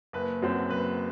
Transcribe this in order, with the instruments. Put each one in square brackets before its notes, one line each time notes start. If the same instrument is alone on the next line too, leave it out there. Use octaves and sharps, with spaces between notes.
[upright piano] F#1 B4
F#2 F#3 C4
F#1 B4